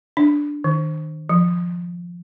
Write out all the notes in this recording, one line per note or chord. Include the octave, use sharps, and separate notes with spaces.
D4
D#3
F3